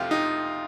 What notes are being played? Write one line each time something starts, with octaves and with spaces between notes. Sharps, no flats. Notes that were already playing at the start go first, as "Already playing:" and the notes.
Already playing: F2 C3 F3 A3 C4 F4 G4
D#4